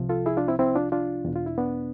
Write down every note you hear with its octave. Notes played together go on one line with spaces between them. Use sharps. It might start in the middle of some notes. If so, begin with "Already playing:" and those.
Already playing: C2 C3 F3
F4 A4
E4 G#4
D4 F4
C4 E4
C4 E4
D4 F4
D4 F4
E2 B2
F4
E4
B3 D4